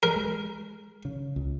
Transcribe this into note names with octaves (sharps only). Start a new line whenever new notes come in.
A#4
G#3
C#3
C#2